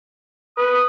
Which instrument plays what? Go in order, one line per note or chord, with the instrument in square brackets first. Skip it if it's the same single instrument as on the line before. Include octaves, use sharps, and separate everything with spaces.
[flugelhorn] B4 [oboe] D#6